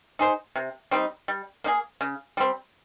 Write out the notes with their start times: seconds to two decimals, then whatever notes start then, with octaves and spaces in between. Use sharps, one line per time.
0.19 D#4 G#4 C5
0.56 C3
0.91 G3 C4 D#4
1.28 G3
1.64 A#3 D#4 G#4
2.01 C#3
2.37 G3 C4